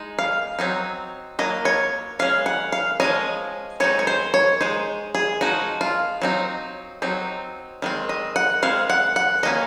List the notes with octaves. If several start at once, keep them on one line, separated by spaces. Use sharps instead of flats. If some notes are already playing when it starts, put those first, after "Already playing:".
Already playing: G#3 D#4
F5
F#3 C4 D#4
F#3 A#3 D#5
C#5
G#3 C#4 F5
F#5
F5
F3 G#3 C#4 D#5
G#3 C4 D#4 C#5
C#5
C5
C#5
G#3 D#4 C5
G#4
F3 G#3 D#4 F#4
F4
F#3 C4 D#4
F#3 C4 D#4
D#3 G#3 C4
D#5
F#5
G#3 C4 F5
F#5
F#5
D#3 A#3 C#4 D#5